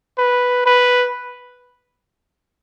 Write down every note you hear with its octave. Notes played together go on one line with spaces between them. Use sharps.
B4
B4